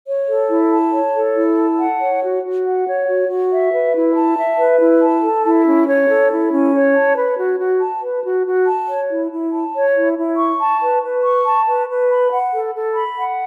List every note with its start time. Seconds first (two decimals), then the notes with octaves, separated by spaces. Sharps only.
0.07 C#5
0.29 A4
0.49 E4
0.71 A5
0.93 C#5
1.14 A4
1.35 E4
1.58 A5
1.79 F#5
2.01 C#5
2.22 F#4
2.44 F#4
2.65 F#5
2.86 C#5
3.08 F#4
3.29 F#4
3.51 E5
3.73 B4
3.94 E4
4.16 A5
4.37 E5
4.58 B4
4.79 E4
5.01 A5
5.22 A4
5.45 E4
5.66 C#4
5.87 C#5
6.09 A4
6.30 E4
6.51 C#4
6.73 C#5
6.94 A5
7.16 B4
7.37 F#4
7.59 F#4
7.80 A5
8.02 B4
8.24 F#4
8.45 F#4
8.67 A5
8.88 C#5
9.10 E4
9.31 E4
9.52 A5
9.74 C#5
9.96 E4
10.17 E4
10.38 C#6
10.60 A5
10.82 B4
11.03 B4
11.24 C#6
11.45 A5
11.67 B4
11.89 B4
12.09 B5
12.31 F#5
12.54 A4
12.75 A4
12.96 B5
13.17 F#5